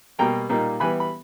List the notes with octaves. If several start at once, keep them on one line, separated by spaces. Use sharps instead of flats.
B2 G3 A#3 G5 A#5
A#2 G3 A#3 D#4
E3 G3 B3 G#5 B5
B5